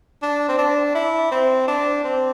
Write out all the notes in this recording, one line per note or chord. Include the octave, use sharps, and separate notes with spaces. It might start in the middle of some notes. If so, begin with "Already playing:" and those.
D4
C4
D4
E4
C4
D4
C4